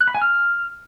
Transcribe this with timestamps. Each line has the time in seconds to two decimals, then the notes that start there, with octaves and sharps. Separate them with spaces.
0.01 F#6
0.08 B5
0.15 G#5
0.22 F6